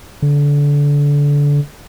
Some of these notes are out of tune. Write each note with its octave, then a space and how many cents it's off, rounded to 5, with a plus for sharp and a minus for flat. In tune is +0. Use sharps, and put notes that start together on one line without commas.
D3 -25